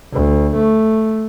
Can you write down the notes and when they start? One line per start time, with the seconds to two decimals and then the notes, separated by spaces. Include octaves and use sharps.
0.13 D2
0.56 A3